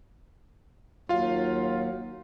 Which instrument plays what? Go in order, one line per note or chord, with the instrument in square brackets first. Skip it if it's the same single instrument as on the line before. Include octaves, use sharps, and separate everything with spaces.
[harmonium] D#2 F#3 [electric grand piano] F4 F5